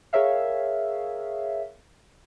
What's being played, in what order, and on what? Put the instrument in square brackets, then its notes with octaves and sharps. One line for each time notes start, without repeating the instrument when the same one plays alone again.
[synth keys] G#4 A#4 C#5 E5 F5